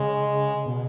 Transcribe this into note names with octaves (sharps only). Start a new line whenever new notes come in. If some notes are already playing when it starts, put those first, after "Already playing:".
Already playing: C#3 G#3
B2